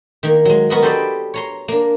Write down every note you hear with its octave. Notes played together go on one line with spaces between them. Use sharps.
D#3 A#3
F#3 G#3
B3 F#4 A#4 B4 D#5
G4 A4 B4 C5 D5 D#5
C#5 A#5 C6
A#3 D4